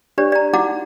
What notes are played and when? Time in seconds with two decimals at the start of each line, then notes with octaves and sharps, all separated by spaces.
0.18 D4 G4 B4 C#5 D5
0.32 D5 A#5
0.53 D#4 E4 F#4 F#5 A#5 D6